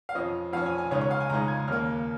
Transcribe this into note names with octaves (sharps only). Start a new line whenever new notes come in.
F5
F2 F3 C#4 D#5
F2 F3 C#4 F5
G#5
G#5
C#2 C#3 G#3 D#4 C#5
C#5
F5
G#5
C#2 C#3 G#3 D#4 A#5
G#6
D#2 C#3 A#3 F6